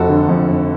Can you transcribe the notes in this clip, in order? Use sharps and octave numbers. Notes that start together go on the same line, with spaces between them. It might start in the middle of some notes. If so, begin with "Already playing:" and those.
Already playing: F1 F2 F#4 A4
D3
F2
F1